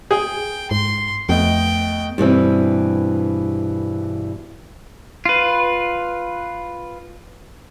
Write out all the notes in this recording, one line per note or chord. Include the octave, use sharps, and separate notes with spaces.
G#4 G5
G#2 C6
F2 A3 B3 D#5 G5
G2 B2 E3 C4
F4 B4